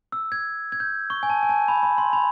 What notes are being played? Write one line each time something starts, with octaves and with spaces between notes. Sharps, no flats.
E6
G#6
G#6
G6
C#6
G#5
A5
G#5
A5
B5
B5
C6
B5